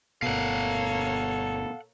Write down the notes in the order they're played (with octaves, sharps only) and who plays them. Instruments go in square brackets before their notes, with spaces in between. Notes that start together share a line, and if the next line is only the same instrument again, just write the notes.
[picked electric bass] G1 B2 [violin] A#3 C#5 [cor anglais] A4 [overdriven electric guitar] F5 F#5